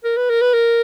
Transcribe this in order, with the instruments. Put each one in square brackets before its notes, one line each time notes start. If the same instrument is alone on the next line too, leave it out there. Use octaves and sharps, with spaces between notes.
[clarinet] A#4
B4
A#4
B4
A#4